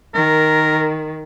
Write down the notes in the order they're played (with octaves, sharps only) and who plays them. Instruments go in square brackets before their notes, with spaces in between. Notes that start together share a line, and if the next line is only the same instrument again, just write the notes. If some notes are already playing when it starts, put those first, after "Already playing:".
[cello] D#3 [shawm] A#4